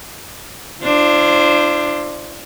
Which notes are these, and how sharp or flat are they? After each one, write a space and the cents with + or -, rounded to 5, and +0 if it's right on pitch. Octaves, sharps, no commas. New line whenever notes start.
D4 +15 F4 -45 C5 +0